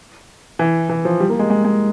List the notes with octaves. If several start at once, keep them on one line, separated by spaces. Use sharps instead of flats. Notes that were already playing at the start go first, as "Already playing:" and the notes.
E3
E3
F3
G3
A#3
G#3
G#3
G#3